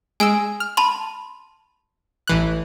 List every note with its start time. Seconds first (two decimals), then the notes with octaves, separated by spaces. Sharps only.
0.20 G#3 G#5 E6 D7
0.60 F6
0.77 A5 B5 C6
2.27 A1 E3 F#6